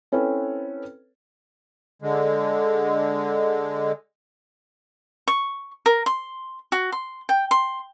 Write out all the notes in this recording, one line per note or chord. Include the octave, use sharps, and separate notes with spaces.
C4 C#4 E4 A4 B4 C#5
D3 G#3
C#6
A#4
C6
F#4
C6
G5
C6